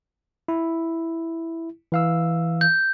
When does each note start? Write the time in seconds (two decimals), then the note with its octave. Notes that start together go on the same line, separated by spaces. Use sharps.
0.48 E4
1.92 E3 F5 E6
2.61 G6